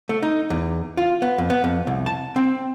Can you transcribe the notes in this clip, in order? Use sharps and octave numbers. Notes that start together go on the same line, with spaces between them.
A3
D#4
E2
F4
B3
F2
B3
F2
C2
A5
C4